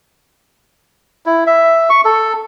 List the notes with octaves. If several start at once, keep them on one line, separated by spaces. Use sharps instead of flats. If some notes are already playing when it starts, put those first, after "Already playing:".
E4
E5
C#6
A4